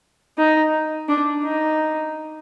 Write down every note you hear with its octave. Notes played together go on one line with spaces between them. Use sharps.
D#4
D4
D#4